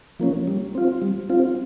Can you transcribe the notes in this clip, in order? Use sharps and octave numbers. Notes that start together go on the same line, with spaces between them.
F3 A#3 C#4
G3
C4 F4
G3
C4 F4